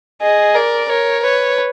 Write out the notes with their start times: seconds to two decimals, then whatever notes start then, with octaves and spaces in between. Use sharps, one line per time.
0.22 G#4 D#5
0.55 A#4 D5
0.89 A#4 C#5
1.23 B4 C#5